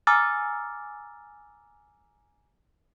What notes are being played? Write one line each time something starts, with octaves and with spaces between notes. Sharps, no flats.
G#5 A#5 D6 E6 F6 A6